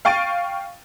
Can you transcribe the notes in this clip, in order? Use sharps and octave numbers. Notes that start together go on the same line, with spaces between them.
F5 G5 C#6 A6 D7 D#7